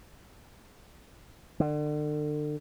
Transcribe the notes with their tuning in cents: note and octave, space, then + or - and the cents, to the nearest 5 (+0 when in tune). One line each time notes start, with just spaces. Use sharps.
D3 +35